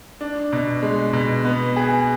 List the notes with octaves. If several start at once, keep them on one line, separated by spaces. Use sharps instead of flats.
D4
B2
G#3
B2
B3
G#4